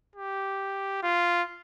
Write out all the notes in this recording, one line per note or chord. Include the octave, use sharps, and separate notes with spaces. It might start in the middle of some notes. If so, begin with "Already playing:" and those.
G4
F4